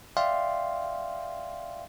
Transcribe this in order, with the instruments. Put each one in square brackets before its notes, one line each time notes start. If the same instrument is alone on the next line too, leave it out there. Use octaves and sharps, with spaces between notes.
[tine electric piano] D5 E5 F5 G5 C6